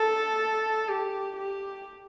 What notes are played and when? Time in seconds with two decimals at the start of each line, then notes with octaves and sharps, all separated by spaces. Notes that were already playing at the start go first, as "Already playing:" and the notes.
Already playing: A4
0.89 G4
1.37 G4